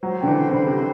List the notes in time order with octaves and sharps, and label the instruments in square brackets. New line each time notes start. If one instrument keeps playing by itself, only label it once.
[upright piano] F#3 [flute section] C5
[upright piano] D3 [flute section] G5
[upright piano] E3
[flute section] C5
[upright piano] D3 [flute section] B5
[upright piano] C3 [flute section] C5